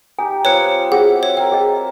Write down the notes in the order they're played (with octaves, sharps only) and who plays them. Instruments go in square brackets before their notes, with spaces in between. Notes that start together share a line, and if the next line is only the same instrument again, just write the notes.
[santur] D#4 G4 [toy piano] G#5
[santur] G3 C4 F4 [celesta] B4 F#6 C#7 [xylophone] C#5
[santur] C4 F#4 E5 [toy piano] G#4 [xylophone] F#5
[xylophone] C#5 [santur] E5
[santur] A#4 E5 [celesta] G5
[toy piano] G#4 D#5